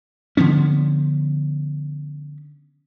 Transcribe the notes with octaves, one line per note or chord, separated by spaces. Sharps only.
D3 F3 B3 C#4